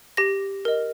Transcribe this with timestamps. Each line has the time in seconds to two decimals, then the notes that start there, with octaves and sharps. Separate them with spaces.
0.17 G4 A#6
0.65 A#4 D#5